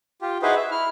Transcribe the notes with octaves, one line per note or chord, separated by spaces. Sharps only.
F4 G4
D#4 E4 F#4 G#4 B4 C5
E5
E4 F6